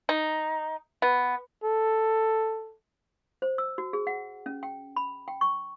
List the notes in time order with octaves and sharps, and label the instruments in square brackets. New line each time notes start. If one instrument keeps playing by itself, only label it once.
[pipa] D#4
B3
[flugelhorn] A4
[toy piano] C5
E6
F#4
G#4
F#5
C#4
G5
B5
G5
C#6